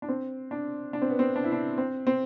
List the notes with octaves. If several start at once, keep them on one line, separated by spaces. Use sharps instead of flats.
D4
C4
D4
D4
C4
B3
C4
D4
E4
D4
C4
C4